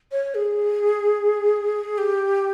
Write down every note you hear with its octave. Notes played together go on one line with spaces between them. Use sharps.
C#5
G#4
G4